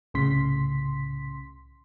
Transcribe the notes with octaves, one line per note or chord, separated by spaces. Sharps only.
C2 A2 C#3 C6 B6